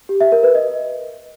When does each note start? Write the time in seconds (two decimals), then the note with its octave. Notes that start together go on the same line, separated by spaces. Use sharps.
0.09 G4
0.21 E5
0.32 A#4
0.43 B4
0.55 D#5